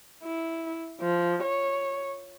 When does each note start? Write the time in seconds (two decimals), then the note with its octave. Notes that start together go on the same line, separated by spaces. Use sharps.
0.23 E4
1.01 F3
1.43 C#5